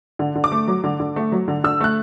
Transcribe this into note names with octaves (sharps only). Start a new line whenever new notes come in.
D3
D3
D6
A3
F#3
D3
D3
A3
F#3
D3
D3 E6
A3 F#6